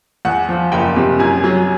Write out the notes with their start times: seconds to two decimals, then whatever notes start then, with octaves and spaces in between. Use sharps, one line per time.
0.25 E2 F#5
0.49 F3
0.72 F#1 G5
0.96 C3
1.19 F#2 G#5
1.44 F#3